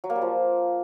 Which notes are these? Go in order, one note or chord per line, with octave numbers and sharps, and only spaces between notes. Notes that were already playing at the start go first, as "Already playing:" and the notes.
F#3
A#3
G3
F3